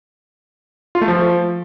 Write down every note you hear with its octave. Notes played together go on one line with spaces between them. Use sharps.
F4
A3
F3